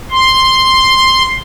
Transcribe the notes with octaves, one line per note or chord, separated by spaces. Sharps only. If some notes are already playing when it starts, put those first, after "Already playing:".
C6